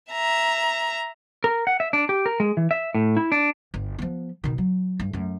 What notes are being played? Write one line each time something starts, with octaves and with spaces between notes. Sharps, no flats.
E5 A#5
A#4
F#5
E5
D4
G4
A#4
G#3
E3
E5
A2
E4
D4
G1
F3 B3
B2 D#3
F#3
G2
F#2 A3